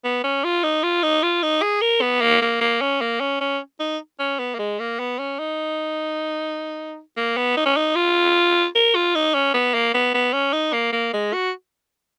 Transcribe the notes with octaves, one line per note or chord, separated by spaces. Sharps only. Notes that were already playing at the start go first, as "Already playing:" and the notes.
B3
C#4
F4
D#4
F4
D#4
F4
D#4
G#4
A#4
B3
A#3
A#3
A#3
C#4
A#3
C#4
C#4
D#4
C#4
B3
A#3
G#3
A#3
B3
C#4
D#4
A#3
B3
D#4
C#4
D#4
F4
A#4
F4
D#4
C#4
B3
A#3
B3
B3
C#4
D#4
A#3
A#3
G#3
F#4